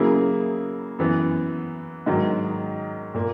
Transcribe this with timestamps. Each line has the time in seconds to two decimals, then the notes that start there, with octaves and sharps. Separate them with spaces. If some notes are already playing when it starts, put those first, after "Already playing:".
Already playing: C#3 F#3 A#3 E4 G#4
0.99 F#2 E3 B3
2.06 G#2 D#3 F#3
3.14 A#2 A#3